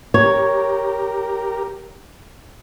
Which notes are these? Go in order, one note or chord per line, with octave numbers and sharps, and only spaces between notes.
G4 A#4 C#5